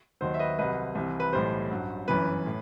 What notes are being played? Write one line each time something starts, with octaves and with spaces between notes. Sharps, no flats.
D#2 D#3 F#3 C5
E5
B4 D#5
C2 C3 F#3 B4 D#5
C2 C3 E3
B4
B1 A2 E3 G3 C5
A1 G2 F#3
G1 F#2 E3 B4
A2